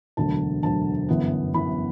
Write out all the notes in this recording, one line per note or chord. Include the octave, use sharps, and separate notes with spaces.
E1 D2 D3 F#3 A5
E1 D2 D3 F#3 A5
G1 F#2 E3 B3
G1 F#2 E3 B3 B5